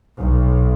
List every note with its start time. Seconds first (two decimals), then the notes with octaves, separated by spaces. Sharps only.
0.17 B1